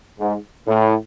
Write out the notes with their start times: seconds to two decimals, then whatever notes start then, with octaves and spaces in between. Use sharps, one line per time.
0.20 G#2
0.67 A2